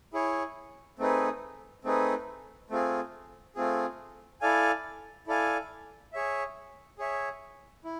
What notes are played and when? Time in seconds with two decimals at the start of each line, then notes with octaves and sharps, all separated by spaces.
0.14 E4 G#4 C#5
0.99 A3 C4 D#4 G#4 B4
1.85 A3 C4 D#4 G#4 B4
2.70 A3 C4 F4 G#4
3.56 A3 C4 F4 G#4
4.41 E4 A4 D5 F5 G#5
5.27 E4 A4 D5 F5 G#5
6.13 G#4 C#5 E5
6.99 G#4 C#5 E5
7.85 E4